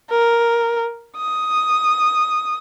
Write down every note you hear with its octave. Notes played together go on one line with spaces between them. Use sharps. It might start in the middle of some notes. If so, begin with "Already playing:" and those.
A#4
D#6